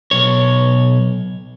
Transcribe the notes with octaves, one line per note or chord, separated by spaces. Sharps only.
B1 C#5